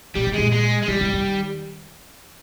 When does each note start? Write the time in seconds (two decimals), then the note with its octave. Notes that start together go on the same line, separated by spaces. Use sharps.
0.16 A#2 G3
0.27 C3
0.34 A#2 G#3
0.53 G#3
0.83 G#3
0.88 C3 G3
1.01 C3
1.13 D#3